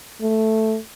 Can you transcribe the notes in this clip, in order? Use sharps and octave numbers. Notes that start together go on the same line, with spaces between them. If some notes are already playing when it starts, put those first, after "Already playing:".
A3